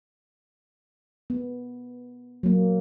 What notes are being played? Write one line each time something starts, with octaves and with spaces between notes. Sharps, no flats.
B3
F#3 A#3